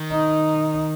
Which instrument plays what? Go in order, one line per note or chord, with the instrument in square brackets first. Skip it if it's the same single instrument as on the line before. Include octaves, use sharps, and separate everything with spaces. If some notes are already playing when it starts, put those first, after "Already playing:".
Already playing: [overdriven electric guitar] D#3
[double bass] D#4